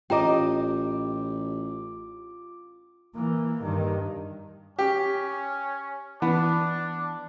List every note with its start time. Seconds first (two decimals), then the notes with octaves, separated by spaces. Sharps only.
0.10 A1 F4 G4 D#5 G5 A#5 D6
3.15 E3 A#3
3.63 G2 D#3
4.79 C#4 G4
6.22 E3 B3 D4